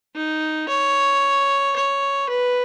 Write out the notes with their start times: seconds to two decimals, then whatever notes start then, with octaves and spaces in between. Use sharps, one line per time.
0.16 D#4
0.69 C#5
1.76 C#5
2.29 B4